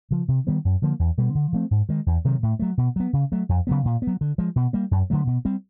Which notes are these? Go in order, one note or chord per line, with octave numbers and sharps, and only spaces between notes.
C#3 F3
C3
D#3 G3 B3
F#2
D3 F3 A#3
E2
B2 G3 B3
D3
F3 A3 C4
G#2
D#3 G#3
E2
C3 D#3 F#3
A2
F#3 A3
B2
F#3 B3
C#3
F#3 A3
F2
C#3 F#3 B3
A#2
B3
F#3
D3
F3 G#3
B2
G3 A#3
F#2
D3 F#3 A3
B2
G3 C4